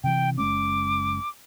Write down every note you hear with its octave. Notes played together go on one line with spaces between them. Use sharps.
C3 E3 G5
F#1 G#3 C#4 D6